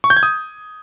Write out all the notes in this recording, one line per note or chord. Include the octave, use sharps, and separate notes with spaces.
C#6
G6
G#6
D#6